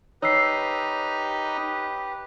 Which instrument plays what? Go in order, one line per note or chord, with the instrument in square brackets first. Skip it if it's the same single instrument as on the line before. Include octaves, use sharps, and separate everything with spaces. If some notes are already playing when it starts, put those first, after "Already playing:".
[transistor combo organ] D#4 [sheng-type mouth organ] G4 B4 [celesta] C#5 E6 C7